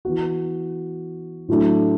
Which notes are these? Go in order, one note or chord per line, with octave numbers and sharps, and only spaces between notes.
E3 B3 F#4
A2 F#3 A3 D4